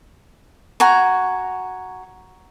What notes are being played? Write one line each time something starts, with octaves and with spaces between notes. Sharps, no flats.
F#4 G#5 A#5